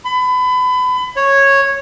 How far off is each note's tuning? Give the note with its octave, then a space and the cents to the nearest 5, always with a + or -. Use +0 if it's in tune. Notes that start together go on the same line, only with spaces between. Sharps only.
B5 +30
C#5 -10